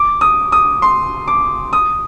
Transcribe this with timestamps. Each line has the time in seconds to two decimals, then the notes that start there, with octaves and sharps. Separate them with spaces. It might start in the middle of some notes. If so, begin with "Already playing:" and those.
Already playing: D6
0.21 D#6
0.52 D#6
0.82 C6
1.28 D6
1.73 D#6